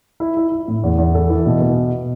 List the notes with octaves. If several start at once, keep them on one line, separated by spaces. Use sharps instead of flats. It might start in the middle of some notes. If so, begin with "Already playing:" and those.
E4
E4
E4
A2
E2
E2
A4
E3
B2
B2